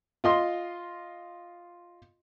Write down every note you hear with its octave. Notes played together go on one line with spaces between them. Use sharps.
F4 D#5 C6